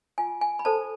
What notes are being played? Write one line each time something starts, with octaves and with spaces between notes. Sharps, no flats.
F4 G#5
G#5
B5
A4 C5 A5